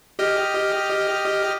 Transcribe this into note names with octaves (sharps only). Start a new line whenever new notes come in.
G4 D#5 F6